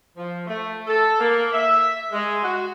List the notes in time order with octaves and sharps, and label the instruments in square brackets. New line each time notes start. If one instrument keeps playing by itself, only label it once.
[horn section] F3
A3
A4
A#3
E5
G#3
F#4